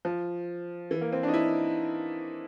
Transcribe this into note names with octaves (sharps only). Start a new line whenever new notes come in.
F3
E3
A#3
C4
D4
D#4
E4